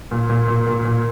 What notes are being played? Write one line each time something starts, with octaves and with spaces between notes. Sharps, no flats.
A#2
A#2
A#2
A#2
A#2